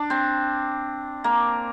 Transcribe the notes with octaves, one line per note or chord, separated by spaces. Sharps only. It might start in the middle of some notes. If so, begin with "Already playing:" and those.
Already playing: D4
C4
A#3